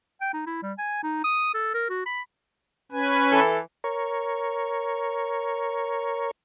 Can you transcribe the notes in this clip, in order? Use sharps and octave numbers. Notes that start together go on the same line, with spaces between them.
G5
D#4
E4
G3
G#5
D#4
D#6
A4
A#4
F#4
B5
C#4 B4 G#5
E3 A4
A#4 C#5